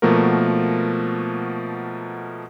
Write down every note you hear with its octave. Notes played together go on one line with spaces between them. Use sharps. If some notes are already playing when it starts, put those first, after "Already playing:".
B2 F3 A3 A#3 F#4 A#4